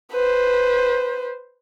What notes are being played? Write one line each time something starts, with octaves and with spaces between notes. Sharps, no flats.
B4 C5